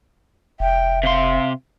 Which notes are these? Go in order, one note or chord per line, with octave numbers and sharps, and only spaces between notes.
F1 E5 G5
C3 F5 C6